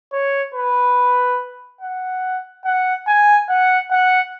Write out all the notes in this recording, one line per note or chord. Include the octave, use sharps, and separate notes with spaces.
C#5
B4
F#5
F#5
G#5
F#5
F#5